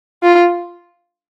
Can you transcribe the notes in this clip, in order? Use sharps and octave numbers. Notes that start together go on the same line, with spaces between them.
F4